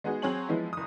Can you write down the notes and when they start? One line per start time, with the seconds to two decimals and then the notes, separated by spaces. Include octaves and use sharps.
0.04 G#3 B3 D#4 F#4 G#4
0.22 F#3 C4 G#4 C#5 G#5 F#7
0.49 E3 F3 G#3 B3 E4
0.73 F#1 D#6